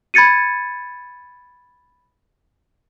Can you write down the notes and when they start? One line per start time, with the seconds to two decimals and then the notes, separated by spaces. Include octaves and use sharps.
0.14 B5 G#6 A6 C#7 D#7